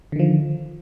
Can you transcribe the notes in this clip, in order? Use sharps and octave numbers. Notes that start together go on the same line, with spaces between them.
D3 D#3 F3